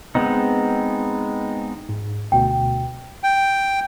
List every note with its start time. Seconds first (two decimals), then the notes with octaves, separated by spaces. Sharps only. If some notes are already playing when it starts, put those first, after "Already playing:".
0.15 G#3 B3 C4 D#4
1.89 G#2
2.32 D2 B2 G5
3.23 G5